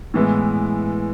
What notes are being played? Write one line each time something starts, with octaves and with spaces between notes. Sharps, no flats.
A2 E3 G#3 B3